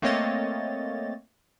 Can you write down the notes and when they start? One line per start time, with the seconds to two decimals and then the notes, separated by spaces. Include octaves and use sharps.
0.02 A3 A#3 C4 C#5 D#5 A6